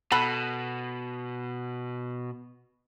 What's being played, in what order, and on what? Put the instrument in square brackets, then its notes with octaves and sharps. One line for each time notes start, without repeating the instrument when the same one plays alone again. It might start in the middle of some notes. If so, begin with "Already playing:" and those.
[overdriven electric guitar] B2 [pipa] A4 F#5 B5